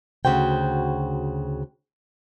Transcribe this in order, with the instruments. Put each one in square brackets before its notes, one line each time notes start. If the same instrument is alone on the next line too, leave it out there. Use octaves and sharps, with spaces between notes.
[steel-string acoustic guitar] D2 C#3 F#4 C5 G5